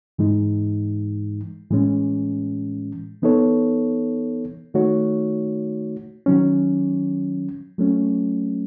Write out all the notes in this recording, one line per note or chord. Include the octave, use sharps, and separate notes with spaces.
G#2 E3 G#3 D#4
A2 E3 G#3 C#4
E3 B3 D#4 A4 C#5
D#3 A3 D#4 F#4 C#5
D#3 F#3 C#4
F#3 A3 C#4